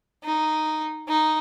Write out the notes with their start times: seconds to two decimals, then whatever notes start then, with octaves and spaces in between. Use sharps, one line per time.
0.24 D#4
1.09 D#4